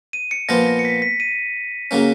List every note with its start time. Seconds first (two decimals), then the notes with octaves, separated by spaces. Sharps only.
0.13 D#7
0.31 C#7
0.49 A#2 F3 B3 F4 A#6
0.67 A#6
0.79 C#7
0.85 B6
1.02 B6
1.20 D#7
1.91 C#3 F#3 A#3 C#4